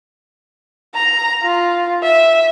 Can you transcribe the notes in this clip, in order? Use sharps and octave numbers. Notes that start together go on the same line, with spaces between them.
A#5
F4
E5